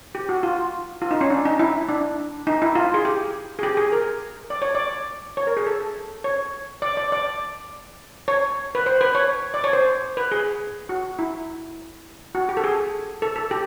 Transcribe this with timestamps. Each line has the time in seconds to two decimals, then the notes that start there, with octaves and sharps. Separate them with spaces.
0.15 G4
0.29 F#4
0.43 F4
1.02 F4
1.11 D#4
1.21 C#4
1.30 D4
1.45 D#4
1.59 E4
1.89 D4
2.47 D#4
2.62 E4
2.75 F4
2.94 G#4
3.05 G4
3.59 G#4
3.63 G4
3.77 G#4
3.92 A#4
4.50 D5
4.62 C#5
4.75 D5
5.37 C#5
5.47 A#4
5.57 G#4
5.67 A4
6.24 C#5
6.82 D5
6.97 D5
7.12 D5
8.28 C#5
8.75 B4
8.86 C5
9.01 B4
9.15 C#5
9.54 D5
9.64 C#5
9.73 C5
10.17 B4
10.32 G#4
10.89 F#4
11.19 E4
12.35 F#4
12.49 G4
12.57 A4
12.64 G#4
13.22 A4
13.36 A4
13.51 G4